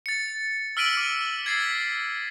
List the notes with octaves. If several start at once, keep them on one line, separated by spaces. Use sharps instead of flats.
A6 C#7
E6 F6 B6 D7 D#7 F#7
D6
G#6 A6 C7
B6